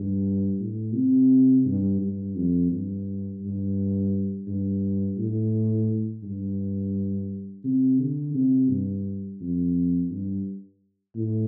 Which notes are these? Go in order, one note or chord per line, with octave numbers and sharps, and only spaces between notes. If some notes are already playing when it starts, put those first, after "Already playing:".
Already playing: G2
A2
C3
G2
G2
F2
G2
G2
G2
A2
G2
C3
D3
C3
G2
F2
G2
A2